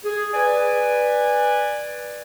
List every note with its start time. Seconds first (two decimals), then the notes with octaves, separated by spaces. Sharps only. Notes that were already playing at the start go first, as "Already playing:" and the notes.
0.05 G#4
0.34 B4 D5 G#5